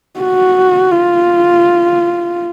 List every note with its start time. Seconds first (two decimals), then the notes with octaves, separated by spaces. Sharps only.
0.20 F#4
0.91 F4